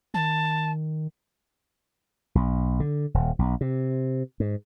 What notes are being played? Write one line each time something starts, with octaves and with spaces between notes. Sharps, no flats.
D#3 A5
B1
D3
D#1
B1
C3
G#2